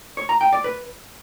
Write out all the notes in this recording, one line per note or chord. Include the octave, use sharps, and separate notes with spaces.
C#5
A#5
G5
D5
B4